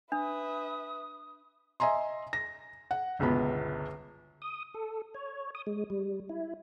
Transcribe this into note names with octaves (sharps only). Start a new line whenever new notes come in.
D4 B4 E5 D#6
D#5 E5 G#5 A#5 C6
A#6
F#5
G1 C#2 B2 B3 B5
D#6
A4
C#5
D#6
G#3
G3
E4